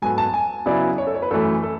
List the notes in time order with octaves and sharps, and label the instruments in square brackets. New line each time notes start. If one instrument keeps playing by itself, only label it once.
[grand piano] G#2 F#3 B3 F#4 A4 [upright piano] G#5
[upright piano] A5
G#5
[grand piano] C#3 F#3 B3 E4 G#4 [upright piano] D5
[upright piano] C#5
A4
C#5
B4
[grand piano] F#2 E3 A3 [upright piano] A4
[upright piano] A4